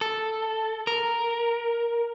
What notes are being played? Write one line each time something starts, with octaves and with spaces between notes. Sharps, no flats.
A4
A#4